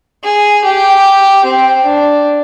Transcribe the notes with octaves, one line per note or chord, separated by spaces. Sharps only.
G#4
G4
C4
D4